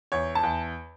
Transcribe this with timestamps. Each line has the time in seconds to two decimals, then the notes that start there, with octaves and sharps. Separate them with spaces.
0.12 E2 C#5
0.35 A5
0.43 E2